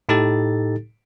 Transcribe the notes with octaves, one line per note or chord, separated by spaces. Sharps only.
A2 D#4 G4 A4 A6